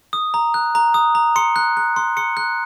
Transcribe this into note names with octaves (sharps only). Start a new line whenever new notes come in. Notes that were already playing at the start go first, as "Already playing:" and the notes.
D#6
A#5
F#6
A#5
D#6
A#5
C6 C#7
F#6
F#6
C6
C6 C#7
F#6